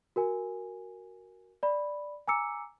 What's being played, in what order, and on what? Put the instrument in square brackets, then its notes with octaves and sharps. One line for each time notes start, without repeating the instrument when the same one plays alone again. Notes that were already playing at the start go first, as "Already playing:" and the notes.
[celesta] F#4 A#4 G#5
D5 B5
G#5 A#5 D6 E6 C#7